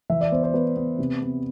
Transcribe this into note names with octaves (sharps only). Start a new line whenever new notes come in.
E3 E5
D5
B3 C5
C5
B3 B4
B3
C3
B3